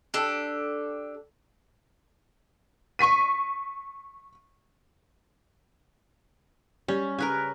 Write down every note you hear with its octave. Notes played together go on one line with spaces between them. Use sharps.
D4 G4 A4
C#6 B6 D#7
G3 C#4
C#3 A#4 B4 G#5